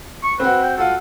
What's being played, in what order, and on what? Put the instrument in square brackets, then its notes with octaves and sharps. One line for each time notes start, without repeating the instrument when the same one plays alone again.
[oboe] C#6
[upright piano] C4 F#4 [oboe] B4
[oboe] G5
[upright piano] F4 F#4 [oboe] A4